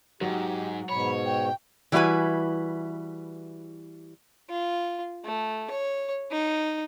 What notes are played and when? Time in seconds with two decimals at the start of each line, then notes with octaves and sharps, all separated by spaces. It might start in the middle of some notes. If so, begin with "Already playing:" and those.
0.21 G#2 F#3 G4
0.89 G#2 B2 C#5 B5
1.25 G5
1.92 E3 G3 E4 F#4 B4 G#5
4.50 F4
5.25 A3
5.70 C#5
6.31 D#4